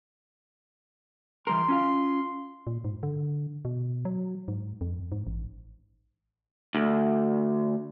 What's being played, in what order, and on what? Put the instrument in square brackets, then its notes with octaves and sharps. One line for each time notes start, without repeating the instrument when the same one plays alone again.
[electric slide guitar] E3 G3 A#4 [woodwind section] C6
[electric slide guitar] C#4 F4 F5
[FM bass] A#2
G#2
D3
B2
F#3
G#2
F2
G#2
A1
[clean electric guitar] D2